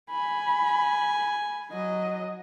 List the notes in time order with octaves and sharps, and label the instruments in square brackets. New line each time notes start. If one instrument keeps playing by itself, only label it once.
[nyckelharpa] G#5 [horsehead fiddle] B5
[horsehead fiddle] F#3 D#5